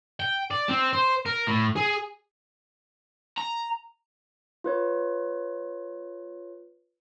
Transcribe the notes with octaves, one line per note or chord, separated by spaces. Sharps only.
G5
D5
C4
C5
A#4
A2
G#4
A#5
F4 B4 C#5